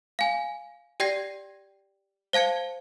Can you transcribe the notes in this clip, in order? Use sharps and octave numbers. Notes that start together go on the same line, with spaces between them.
F5 G#5
G4 D5 G5 G#6 A#6 C7
C5 F5 A5 G#6 C#7